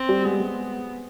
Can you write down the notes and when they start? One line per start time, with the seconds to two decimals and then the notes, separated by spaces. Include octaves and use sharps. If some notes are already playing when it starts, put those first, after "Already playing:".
Already playing: C4
0.09 G3
0.25 G#3 B3
0.40 G#3